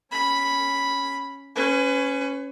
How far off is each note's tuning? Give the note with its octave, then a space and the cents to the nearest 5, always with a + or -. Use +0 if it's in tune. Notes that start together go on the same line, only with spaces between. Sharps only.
C#4 +0 B5 +0
C#4 +0 B4 +30